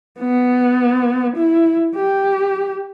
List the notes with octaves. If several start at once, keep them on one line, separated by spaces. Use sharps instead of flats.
B3
E4
G4